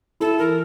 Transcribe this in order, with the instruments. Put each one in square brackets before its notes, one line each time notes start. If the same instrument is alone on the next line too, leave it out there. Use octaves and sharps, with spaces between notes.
[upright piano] E4 [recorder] A4
[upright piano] E3 [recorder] A#4